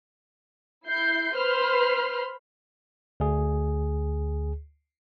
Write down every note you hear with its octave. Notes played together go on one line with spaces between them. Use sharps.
E4 G6 C7
B4 C5 B5 C6 F6
D2 G#4